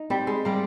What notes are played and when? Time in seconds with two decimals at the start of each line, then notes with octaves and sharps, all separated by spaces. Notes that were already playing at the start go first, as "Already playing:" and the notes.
Already playing: D#4
0.10 G3 C4
0.27 G#3
0.45 G3 A#3